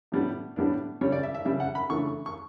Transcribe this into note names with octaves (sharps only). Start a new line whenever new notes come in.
A2 G3 B3
A2 G3 B3 D4
C#3 G3 C#4 C#5
D5
E5
E5
C#3 G3 D4 E5
F#5
B5
C#3 E3 A3 D4 C#6
C#6